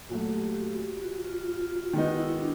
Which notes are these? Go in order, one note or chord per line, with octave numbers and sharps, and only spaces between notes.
A#2 F#3 A3 F#4
G4
F4
F#4
F4
F4
F#4
D#3 G#3 B3 D#4 F#4
E4
D4